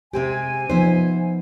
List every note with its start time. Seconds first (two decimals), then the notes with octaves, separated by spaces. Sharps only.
0.13 C3 G#3 C4 G4 G#5
0.70 F3 B3 D#4 C5 E5